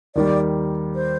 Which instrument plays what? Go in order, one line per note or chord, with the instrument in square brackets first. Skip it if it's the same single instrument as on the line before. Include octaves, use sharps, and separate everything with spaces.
[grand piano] D#2 D#3 G3 [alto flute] D5
[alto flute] C5